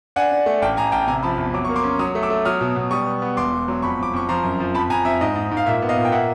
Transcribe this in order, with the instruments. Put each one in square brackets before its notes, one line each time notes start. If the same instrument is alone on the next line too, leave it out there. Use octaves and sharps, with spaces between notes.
[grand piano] D4 F#5 G#5
D4
A3
A1 G5 A5
A1 G#5 A#5
A1 G5 A5
C3 G#5 A#5
F3 A5 B5
E2
F#3 D6
A#3 C#6
C6 D6
C#4
F#3 C#6 D#6
A3
D6 E6
A3
F#3 D#6 F6
B2
B2
G3 C#6 D#6
B3
B3
E1 C6 D6
E1
F#3
F2 B5 C#6
F2 D6
F2 C#6
F3 A#5 C6
F#2
F3
F2 A5 B5
F2 G#5 A#5
F2 E5
G#2 D#5
G#2
G#2
F5
A#2 E5
B3
D#5 F5
A#2
G5
A#3 E5 F#5